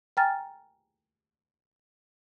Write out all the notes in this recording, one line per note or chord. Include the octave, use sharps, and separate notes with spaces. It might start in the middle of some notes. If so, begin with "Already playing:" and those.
G5 G#5 A#5 F6 A6